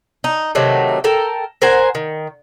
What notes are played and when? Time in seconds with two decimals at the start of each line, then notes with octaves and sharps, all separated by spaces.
0.24 D#4
0.55 C3 D#3 F#3 A3
1.04 A4 A#4 G5
1.62 A#4 C5 F#5 G#5
1.95 D#3